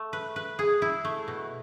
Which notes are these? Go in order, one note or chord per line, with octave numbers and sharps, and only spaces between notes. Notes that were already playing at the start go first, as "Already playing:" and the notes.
Already playing: A3
B4
B4
G#4
E4
A3
B2